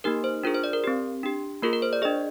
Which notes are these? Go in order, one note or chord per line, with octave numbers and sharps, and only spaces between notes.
A#3 D#4 G4 A#4
C5
D4 F4 G#4 A#4
C5
D5
A#4
C4 G4
D4 G4
A#3 F4 G#4 A#4
A#4
C5
D5
D4 G#4 D#5